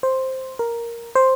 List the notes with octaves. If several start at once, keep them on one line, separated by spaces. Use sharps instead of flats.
C5
A#4
C5